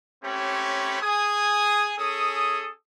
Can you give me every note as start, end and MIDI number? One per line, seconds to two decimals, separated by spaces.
0.24 1.01 57
0.24 1.01 60
0.24 1.01 61
0.24 1.01 67
0.24 1.01 73
0.24 1.01 83
1.02 1.93 68
1.02 1.93 80
1.02 1.93 87
1.98 2.69 61
1.98 2.69 68
1.98 2.69 69
1.98 2.69 87